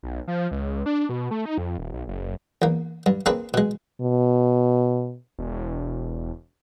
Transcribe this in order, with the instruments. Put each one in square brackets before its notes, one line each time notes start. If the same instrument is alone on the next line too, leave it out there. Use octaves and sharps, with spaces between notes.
[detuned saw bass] B1
F3
C#2
D4
B2
A3
D#4
F2
D#1
B1
F#1
[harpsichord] E2 A#3
G2
A#3 C4 D4 G#4 B4
B2 G#3
[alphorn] B2
[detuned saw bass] E1